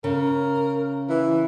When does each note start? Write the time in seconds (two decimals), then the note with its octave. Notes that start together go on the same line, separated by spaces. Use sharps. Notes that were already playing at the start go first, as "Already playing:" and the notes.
0.04 C#3 A#4
1.09 E3